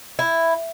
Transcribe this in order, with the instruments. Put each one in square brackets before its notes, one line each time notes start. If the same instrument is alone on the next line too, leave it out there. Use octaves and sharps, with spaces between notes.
[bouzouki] E4